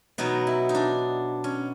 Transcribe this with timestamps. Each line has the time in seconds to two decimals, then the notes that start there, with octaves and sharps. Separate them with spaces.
0.18 B2 F#3 B3 D#4
0.47 E4
0.69 D#4
0.75 D4
1.44 C#4